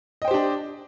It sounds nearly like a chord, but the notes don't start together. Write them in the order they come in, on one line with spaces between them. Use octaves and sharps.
D#5 G5 C5 G4 D4